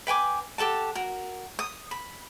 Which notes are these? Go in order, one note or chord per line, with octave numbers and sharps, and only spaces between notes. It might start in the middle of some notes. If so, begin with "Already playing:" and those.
B4 G5 G#5 D6
G4 A4 F#5 A5
F#4 A#4
D#6
B5